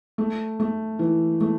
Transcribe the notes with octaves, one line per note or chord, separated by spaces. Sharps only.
A3
A3
E3
A3